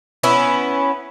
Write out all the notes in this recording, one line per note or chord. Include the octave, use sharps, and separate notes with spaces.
B3 C#4 E4